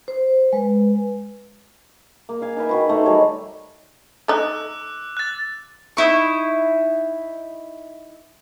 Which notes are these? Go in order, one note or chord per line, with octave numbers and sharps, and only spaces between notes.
C5
G#3 B4
A#3
F5 G#5
D#4 A#4 B4 E5
D#3 F#4 B4
D#3 A3 D#4 C5
F#3 G3 G#4 C#5
A3 D#4 D6 E6 F#6
F#6 A6
D#4 E4 C#6